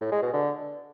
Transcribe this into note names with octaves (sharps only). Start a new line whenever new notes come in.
A2
G#3
B2
D3